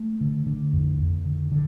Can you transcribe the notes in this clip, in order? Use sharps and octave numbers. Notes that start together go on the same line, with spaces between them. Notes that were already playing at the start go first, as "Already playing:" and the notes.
Already playing: A3
D3
D3
F2
F2
D3
D3